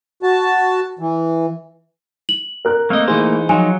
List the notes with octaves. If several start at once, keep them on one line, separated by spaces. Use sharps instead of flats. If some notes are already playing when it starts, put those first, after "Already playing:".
F#4 A5
E3
F#7
A#4 F#6
A3 A#3 C4 D#5
E3 D#4 G#4 C5
F3 F#3 D#4 F4 G#5